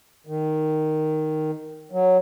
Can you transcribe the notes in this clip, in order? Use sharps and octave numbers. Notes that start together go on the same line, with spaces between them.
D#3
F#3